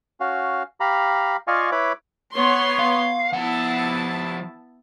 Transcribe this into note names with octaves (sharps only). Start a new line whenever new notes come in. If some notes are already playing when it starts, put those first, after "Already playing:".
C#4 F#4 F5
G4 F5 A#5 B5
F4 D5 D#5 F5 G#5 C#6
E4 B4 C#5 B5 D6
B3 C#5 C6
F5
F3 B3 E4 F#5 A5